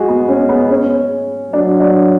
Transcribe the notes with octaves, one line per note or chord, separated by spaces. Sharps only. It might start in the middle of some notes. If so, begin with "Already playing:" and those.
Already playing: G#3 F#4 G#4
B3
C#4
B3
C#4
F#3 D4
D4